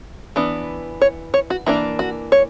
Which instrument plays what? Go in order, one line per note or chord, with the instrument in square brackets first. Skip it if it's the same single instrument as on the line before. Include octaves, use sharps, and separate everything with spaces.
[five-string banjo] E3 B3 D4
C#5
C#5
F#4
E3 A#3 D4 E4
F#4
C#5